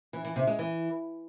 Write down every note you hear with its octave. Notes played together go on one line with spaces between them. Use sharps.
E3
E3
C3
G#3
E3